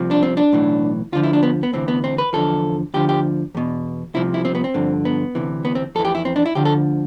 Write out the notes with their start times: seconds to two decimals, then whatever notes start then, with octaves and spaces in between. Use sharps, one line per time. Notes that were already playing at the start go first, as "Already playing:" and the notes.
Already playing: C2 C3 F3
0.11 D4
0.23 C4
0.37 D4
0.53 B1 A2 E3
1.12 D2 D3 F3 F4
1.23 E4
1.33 D4
1.43 B3
1.63 B3
1.73 D2 C3 E3 C4
1.88 B3
2.04 C4
2.18 B4
2.33 E2 D3 F3 A4
2.94 D2 D3 F3 G4
3.09 G4
3.55 E2 B2
4.14 C2 C3 F3 E4
4.34 E4
4.45 C4
4.55 B3
4.64 C4
4.74 G2 D3 F3
5.05 B3
5.35 D2 C3 E3
5.65 B3
5.75 C4
5.95 F2 A4
5.99 E3
6.05 G4
6.15 E4
6.25 C4
6.36 D4
6.46 E4
6.55 D2 D3 F3 G4
6.65 A4